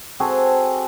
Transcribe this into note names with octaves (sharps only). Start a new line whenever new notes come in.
C4 F#4 G#4 A4